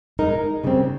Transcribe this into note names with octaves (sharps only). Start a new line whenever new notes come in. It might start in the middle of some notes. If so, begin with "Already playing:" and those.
G#3 D#4 A#4
C#3 G3 C4